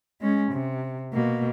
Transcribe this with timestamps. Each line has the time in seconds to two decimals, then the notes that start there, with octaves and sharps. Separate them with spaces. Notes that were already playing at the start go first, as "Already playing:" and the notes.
0.21 G#3 C#4
0.52 C3
1.13 B2 A#3